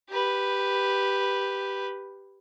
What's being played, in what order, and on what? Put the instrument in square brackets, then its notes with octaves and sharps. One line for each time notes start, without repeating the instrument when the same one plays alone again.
[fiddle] G4 B4